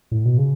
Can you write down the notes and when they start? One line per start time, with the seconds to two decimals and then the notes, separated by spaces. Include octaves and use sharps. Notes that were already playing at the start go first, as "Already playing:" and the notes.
0.12 A2
0.25 B2
0.38 C#3